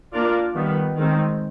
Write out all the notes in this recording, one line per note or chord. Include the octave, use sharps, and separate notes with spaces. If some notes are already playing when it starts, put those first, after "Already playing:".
A#3 D4 F4 A#4 D5
D#3 G3 B3
D#3 G#3 C4